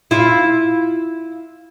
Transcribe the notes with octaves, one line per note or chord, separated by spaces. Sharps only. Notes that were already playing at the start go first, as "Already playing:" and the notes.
E4 F4